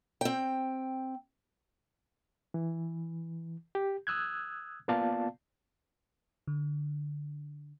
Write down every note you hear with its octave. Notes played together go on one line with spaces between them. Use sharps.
C4 G5
E3
G4
D#6 E6 F#6 G#6
A#3 B3 F4 D5 F5 A5
D3